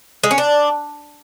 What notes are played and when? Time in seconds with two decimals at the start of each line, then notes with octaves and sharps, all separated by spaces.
0.23 G#3
0.31 C#4
0.38 D4